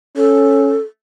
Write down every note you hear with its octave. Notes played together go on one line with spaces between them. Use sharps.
C#4 A4